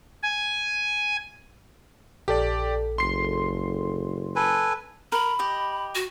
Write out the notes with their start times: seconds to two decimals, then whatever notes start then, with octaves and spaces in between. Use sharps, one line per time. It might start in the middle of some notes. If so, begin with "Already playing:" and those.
0.23 G#5
2.28 A#1 G4 A4 D5
2.98 F#1 C6 C7
4.36 A4 B4 G#5
5.12 A#4 B5
5.39 G4 D#5
5.95 F#4